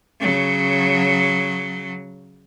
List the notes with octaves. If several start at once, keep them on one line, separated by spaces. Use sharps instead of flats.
C#3 F#3